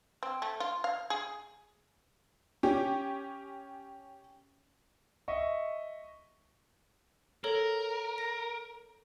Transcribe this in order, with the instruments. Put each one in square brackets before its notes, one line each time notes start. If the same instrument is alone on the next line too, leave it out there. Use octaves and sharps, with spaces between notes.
[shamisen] C4
A3
F4
F5
G#4
[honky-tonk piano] C#4 G4
[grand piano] D#5 E5 C#6
[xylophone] A4 C#5 [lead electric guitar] A#4
[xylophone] A#6